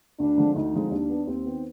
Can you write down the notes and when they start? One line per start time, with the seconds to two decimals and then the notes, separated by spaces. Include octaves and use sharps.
0.19 D2 D4
0.37 D3 F3 G#3 C4
0.55 D2 D#4
0.73 D3 F3 G#3 C4
0.91 D#2 D4
1.09 D#3 B3
1.27 D#2 C4
1.45 D#3 B3